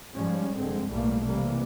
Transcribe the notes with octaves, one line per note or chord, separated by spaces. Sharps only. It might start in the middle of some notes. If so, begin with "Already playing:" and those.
G#2 F3 G3 C#4
F1 G2 D3 G#3 C4
B1 A2 E3 G3 A3 A#3
C3 E3 G3 A#3